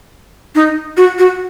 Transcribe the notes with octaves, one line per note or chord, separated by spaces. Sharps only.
D#4
F#4
F#4